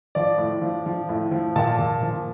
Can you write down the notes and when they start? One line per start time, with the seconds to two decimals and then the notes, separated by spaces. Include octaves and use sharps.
0.15 F3 D5
0.38 A2
0.62 F3
0.86 F3
1.09 A2
1.31 F3
1.56 A#2 A5
1.78 A#2
2.02 F3